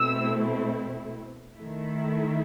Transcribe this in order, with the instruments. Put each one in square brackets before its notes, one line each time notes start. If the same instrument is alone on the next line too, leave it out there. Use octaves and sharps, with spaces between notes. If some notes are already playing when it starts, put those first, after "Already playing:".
Already playing: [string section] B2 A3 C4 E4 E6
D#3 A3 E4